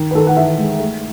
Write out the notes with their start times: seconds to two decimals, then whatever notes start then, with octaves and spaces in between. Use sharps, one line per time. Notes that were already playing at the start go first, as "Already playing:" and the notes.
Already playing: D#3
0.11 B4
0.15 D#3 A4
0.27 F#5
0.37 E3 E5
0.58 G#3
0.79 A3